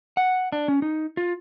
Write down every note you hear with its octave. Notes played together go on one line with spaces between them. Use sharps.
F#5
D4
C#4
D#4
F4